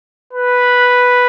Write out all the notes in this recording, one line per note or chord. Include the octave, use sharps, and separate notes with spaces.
B4